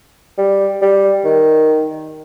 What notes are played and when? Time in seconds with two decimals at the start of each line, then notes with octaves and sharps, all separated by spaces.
0.38 G3
0.82 G3
1.25 D#3